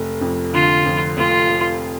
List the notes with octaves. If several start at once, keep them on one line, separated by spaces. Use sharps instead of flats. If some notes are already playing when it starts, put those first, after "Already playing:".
Already playing: F1
F2
D3 F4
F2
F1 F4
F1